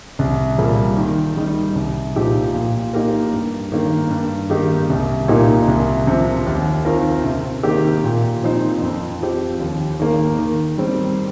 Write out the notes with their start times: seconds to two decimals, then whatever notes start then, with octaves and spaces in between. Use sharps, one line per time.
0.19 C2
0.58 A#2 G3 A#3
0.97 D#3
1.37 G3 D#4
1.75 C2
2.15 A#2 F3 D#4 G4
2.54 A#2
2.93 A#3 D#4 G4 A#4
3.32 G2
3.72 D#3 A#3
4.10 G2
4.50 D#3 A#3 D#4 G4
4.90 C2
5.28 A#2 A#3 D#4 G4
5.68 C2
6.07 C3 F3
6.47 D#2
6.85 D#3 C4 F4 A#4
7.25 C3
7.63 D#3 A#3 G4
8.04 A#2
8.43 F3 C4 D#4 C5
8.82 F2
9.21 F3 C4 G4
9.60 D#2
10.00 D#3 A#3
10.39 D#3
10.78 G3 C4